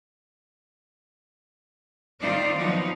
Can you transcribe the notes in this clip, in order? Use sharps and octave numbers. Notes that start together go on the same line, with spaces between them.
D#3 C4 D#4 F4 C5 D5
F3 F#3 B3 D#4